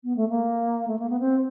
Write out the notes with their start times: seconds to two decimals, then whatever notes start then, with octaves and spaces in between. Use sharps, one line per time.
0.04 B3
0.16 A3
0.29 A#3
0.88 A3
0.99 A#3
1.09 B3
1.20 C4